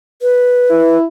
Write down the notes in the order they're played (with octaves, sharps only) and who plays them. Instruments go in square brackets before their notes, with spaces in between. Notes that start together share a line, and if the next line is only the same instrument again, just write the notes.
[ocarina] B4
[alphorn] E4